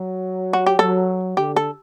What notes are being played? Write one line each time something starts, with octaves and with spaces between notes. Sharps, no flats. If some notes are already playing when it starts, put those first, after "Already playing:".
Already playing: F#3
F#4
G4
F#3 A4
D3 G4
A4